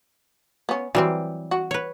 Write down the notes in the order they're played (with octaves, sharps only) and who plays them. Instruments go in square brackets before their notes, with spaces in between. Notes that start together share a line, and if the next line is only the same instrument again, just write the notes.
[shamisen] B3 C#4
[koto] E3 G3 C4 [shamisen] F#3
[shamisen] F#4
[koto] B4 C#5